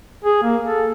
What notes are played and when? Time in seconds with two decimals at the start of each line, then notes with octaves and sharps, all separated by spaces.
0.24 G#4
0.43 A#3
0.64 A4